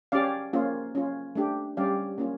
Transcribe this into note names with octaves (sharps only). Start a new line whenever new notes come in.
C#4 G4 D5 F5
A#3 C#4 F4
C#4 F4
A3 D4 G4
G3 C#4 G4 D5 F5
A#3 C#4 F4